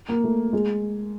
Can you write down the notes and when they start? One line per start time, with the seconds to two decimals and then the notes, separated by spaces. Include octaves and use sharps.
0.09 A#3
0.24 A3
0.53 G#3